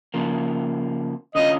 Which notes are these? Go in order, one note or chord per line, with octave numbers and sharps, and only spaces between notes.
C#3 F3 A#3
D3 C#4 F4 D#5